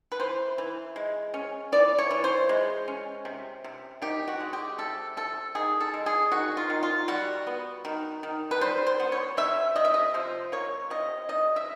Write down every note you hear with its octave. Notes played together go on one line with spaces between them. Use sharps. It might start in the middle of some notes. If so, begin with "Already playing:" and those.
B4
E3 C5
E3
G#3
C#4
E3 D5
C#5
E3
C5
G#3
C#4
C3
C3
D#3 G4
F#4
G#3
G4
C3 A4
C3 A4
D#3 G#4
A4
G#3
G#4
D#3 F#4
F4
D#3
F4
G3 F#4
B3
D#3
D#3
B4
G3 C5
C5
B3
C#5
C3 E5
C3 D#5
E5
D#5
F3 C5
A#3 C#5
C3 D#5
C3 D#5
E5